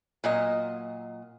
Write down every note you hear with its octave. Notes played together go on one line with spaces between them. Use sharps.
A#2 F#3 D#5